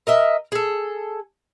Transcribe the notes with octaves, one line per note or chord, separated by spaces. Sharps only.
A#4 D#5 E5
G#4 A4